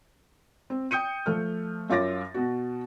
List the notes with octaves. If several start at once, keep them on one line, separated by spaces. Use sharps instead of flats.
C4
G5 D#6 G6 C#7 D#7
F3 A3 F6
F#2 F4 C#5 D6 A6 A#6
B2 F#4